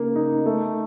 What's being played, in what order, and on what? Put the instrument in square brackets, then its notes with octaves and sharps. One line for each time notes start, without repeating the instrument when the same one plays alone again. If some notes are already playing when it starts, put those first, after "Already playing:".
Already playing: [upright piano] C#3 A#3 D#4
D#4
A3